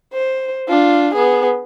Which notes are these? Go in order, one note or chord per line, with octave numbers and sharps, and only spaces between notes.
C5
D4 F4
B3 G#4